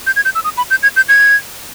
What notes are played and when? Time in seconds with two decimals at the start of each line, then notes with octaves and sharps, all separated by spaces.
0.07 G6
0.16 G#6
0.25 G6
0.35 E6
0.44 D#6
0.57 B5
0.71 G6
0.83 G#6
0.96 G6
1.09 G#6